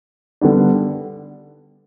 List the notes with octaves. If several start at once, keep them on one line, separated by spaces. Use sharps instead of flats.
D3 G3 B3 D4